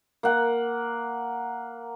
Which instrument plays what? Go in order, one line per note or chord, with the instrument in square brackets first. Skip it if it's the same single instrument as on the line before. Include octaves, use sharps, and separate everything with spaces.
[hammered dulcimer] A#3 F#5